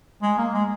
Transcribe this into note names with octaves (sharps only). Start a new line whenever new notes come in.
G#3
A#3
G#3